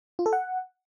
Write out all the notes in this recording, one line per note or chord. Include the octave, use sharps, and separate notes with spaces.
F4
A4
F#5